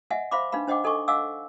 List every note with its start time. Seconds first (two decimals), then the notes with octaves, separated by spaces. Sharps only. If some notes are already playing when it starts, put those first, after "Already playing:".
0.10 D#5 E5 F#5 G#5
0.31 C5 E5 F5 B5 C6 D6
0.52 D4 D#4 B4 F5 B5
0.68 D4 C5 D#5 F#5 G5 D6
0.84 D#4 A4 D#5 G#5 C#6 D6
1.08 D#5 F5 F#5 G#5 D6 E6